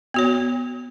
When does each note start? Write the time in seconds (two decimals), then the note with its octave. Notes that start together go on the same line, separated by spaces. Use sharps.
0.14 B3 F#4 C#5